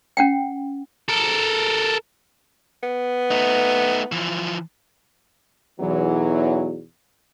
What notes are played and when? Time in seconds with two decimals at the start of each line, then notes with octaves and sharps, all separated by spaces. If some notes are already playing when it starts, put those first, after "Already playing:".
0.17 C#4 F#5 G5
1.09 A4 A#4
2.83 B3
3.31 A3 D#4
4.12 E3 F3
5.80 B1 E2 E3 F#3